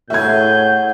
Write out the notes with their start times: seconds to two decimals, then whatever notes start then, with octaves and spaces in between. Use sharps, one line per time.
0.10 A2 F#4 G#4 E5 G6 G#6